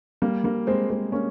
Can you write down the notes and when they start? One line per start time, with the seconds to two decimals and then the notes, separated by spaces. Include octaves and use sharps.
0.22 G3 A#3
0.44 G3 A#3
0.67 G#3 C4
0.90 G#3 C4
1.12 A#3 C#4